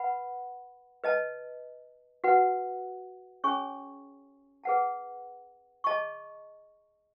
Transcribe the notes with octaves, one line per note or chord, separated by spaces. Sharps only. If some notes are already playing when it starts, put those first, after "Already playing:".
Already playing: B4 F#5 B5
B4 D#5 A5
F#4 B4 F#5
C#4 G#4 C#5 G#5 C#6
G#4 B4 F#5 A5
G#4 D#5 A5 C#6